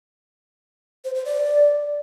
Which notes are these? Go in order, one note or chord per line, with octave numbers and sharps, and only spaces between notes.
C5
C5
D5